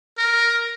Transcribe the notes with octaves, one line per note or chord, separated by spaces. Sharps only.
A#4